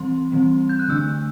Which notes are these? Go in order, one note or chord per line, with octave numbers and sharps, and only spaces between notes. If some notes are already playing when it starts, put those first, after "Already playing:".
Already playing: E3 G3 C4 C6
E3 G3 C4
G6
F#6
D3 A3 D4 E6